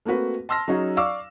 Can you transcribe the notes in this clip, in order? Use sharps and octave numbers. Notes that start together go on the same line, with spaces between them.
A3 A#3 C4 F#4 B4
A5 C6 E6 F6 A#6
F#3 C#4 D#4 F#4 G#4
D5 F5 C#6 D6 E6